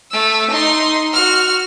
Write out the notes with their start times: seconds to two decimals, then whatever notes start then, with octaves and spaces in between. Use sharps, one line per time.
0.11 A3 E6
0.51 D#4 C6
1.13 F#4 F6